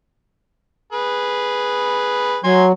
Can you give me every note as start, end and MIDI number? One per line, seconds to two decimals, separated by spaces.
0.93 2.37 68
0.93 2.37 71
2.44 2.72 54
2.44 2.65 80
2.44 2.65 84